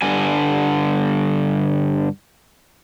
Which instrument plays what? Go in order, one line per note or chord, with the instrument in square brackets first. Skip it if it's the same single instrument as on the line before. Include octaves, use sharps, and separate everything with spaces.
[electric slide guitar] G2 D3 G3 G#5